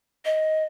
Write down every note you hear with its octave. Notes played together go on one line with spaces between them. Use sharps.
D#5